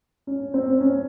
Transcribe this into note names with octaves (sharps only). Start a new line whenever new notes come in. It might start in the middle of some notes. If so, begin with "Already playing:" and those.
C#4
C4
C#4